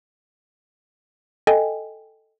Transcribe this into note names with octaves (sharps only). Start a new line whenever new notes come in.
A4 D#5 G5 G#5